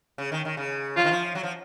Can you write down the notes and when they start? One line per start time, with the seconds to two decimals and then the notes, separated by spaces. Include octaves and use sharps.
0.18 C#3
0.32 D#3
0.45 D#3
0.57 C#3
0.96 F3 F4
1.04 D#3
1.11 F3
1.35 F#3
1.43 F3